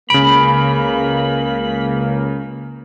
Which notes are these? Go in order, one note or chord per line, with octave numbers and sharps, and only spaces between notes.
C#2 C#3 A#3 B5 D7